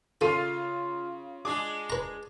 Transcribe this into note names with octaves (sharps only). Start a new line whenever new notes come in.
C#3 F4 A4 C6 D#7
G#3 D4 G#4 D6
B4 A#5